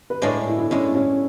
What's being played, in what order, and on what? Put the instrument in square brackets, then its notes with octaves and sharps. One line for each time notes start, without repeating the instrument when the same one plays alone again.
[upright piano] B4
[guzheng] A2 G#3 D4 [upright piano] C#5
[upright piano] E4
E4
[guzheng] A2 G#3 D4 [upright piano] C#4
[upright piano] C#4